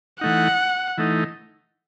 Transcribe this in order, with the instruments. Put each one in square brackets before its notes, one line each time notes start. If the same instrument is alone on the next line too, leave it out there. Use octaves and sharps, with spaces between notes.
[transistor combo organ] E3 A3 D#4 [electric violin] F#5
[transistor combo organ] E3 A3 D#4